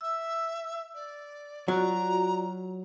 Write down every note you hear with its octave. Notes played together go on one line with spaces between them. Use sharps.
E5 E6
D5
F#3 F4 F#4 D5 A#5